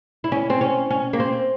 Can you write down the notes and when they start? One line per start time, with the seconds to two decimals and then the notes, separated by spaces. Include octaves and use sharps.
0.24 E4
0.32 C#4
0.50 C4
0.61 C#4
0.91 C#4
1.13 A#3
1.20 C4